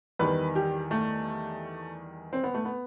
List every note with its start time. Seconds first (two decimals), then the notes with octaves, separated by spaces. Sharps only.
0.19 E2 D#3 G3 B4
0.55 G4
0.91 A3
2.33 C4
2.43 B3
2.54 A3
2.65 B3